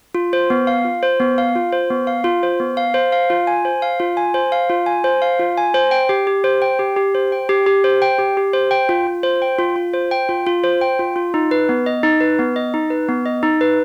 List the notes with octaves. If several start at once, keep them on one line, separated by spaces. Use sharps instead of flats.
F4
C5
B3
F5
F4
C5
B3
F5
F4
C5
B3
F5
F4
C5
B3
F5
C5
F5
F4
G#5
C5
F5
F4
G#5
C5
F5
F4
G#5
C5
F5
F4
G#5
C5
G5
G4
G4
C5
G5
G4
G4
C5
G5
G4
G4
C5
G5
G4
G4
C5
G5
F4
F4
C5
G5
F4
F4
C5
G5
F4
F4
C5
G5
F4
F4
D#4
B4
B3
D#5
D#4
B4
B3
D#5
D#4
B4
B3
D#5
D#4
B4